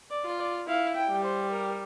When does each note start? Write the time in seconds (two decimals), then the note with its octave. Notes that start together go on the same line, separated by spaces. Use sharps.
0.10 D5
0.24 F4
0.39 D5
0.67 E4 F5
0.95 G5
1.09 G3
1.24 C5
1.51 A#4